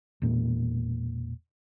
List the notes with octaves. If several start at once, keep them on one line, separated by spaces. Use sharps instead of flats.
E1 A#2